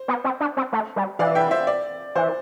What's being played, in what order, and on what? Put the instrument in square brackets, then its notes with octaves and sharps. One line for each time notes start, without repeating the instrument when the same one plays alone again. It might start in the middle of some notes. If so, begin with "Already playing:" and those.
Already playing: [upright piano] C5
[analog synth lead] B3
C4
D4
C4
A3
G3
[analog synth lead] E3 [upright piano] D5 F5
[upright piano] E5 G5
C5 E5
D5
[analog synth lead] E3 [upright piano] C5